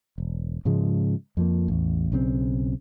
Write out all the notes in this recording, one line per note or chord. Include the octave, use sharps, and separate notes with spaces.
E1
G#2 C#3 F3 G#3
F2 F3 A#3
A1 E2
B1 C#3 F3 C4